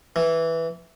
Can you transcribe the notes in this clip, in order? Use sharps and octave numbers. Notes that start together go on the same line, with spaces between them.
E3